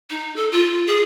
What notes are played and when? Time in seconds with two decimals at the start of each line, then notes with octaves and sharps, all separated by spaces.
0.10 D#4
0.36 A4
0.51 F4
0.87 G#4